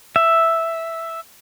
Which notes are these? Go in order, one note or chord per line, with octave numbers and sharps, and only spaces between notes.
E5